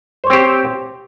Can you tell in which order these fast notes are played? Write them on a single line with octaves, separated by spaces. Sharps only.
C5 C#5 C4 G4